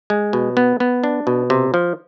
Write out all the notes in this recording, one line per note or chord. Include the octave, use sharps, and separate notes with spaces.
G#3
B2
B3
B3
D4
B2
C3
F3